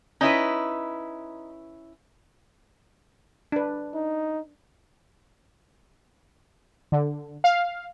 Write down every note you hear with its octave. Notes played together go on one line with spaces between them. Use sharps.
C#4 D#4 E4 B4
D4 B4
D#4
D3
F5